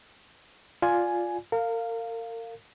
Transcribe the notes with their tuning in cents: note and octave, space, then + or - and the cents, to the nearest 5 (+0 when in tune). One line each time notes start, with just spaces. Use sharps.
F4 +0 D5 -5 G#5 +5
A#4 -35 F5 +0